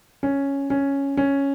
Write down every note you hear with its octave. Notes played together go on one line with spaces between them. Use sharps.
C#4
C#4
C#4